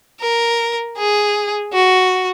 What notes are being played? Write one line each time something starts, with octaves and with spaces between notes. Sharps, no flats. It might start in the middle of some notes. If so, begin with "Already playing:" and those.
A#4
G#4
F#4